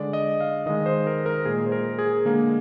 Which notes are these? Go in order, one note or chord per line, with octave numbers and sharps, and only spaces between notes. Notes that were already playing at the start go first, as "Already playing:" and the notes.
Already playing: D3 G#3 D5
D#5
F5
D#3 G#3 D#5
C5
A#4
A#4
A#2 G#3 G#4
C5
A#4
G#4
D3 G#3 A#3